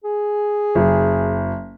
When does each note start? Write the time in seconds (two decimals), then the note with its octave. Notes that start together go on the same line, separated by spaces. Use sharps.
0.04 G#4
0.75 F#1